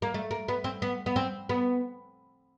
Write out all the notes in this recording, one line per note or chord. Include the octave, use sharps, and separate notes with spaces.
A#3
A3
A#3
B3
C4
B3
B3
C4
B3